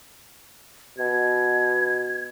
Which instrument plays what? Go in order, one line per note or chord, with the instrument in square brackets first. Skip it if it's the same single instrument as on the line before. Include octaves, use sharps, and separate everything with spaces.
[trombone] B2 [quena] G#6